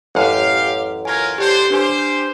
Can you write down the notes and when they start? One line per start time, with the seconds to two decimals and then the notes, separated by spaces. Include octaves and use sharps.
0.15 A1 F#2 G4 F5
1.05 C#4 F4 A#4 G#5 G#6
1.38 D4 G4 C5
1.70 D4 G4 B4 C5 G#5